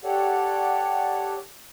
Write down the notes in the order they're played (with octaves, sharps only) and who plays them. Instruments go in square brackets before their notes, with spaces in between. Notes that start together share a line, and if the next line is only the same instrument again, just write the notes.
[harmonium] G4 A4 C#5 D5 F#5